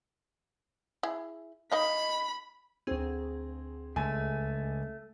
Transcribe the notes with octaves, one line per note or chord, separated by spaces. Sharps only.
E4 G#4
D#4 D#5 F5 B5
D2 C4 G#4
C#2 A3 G#5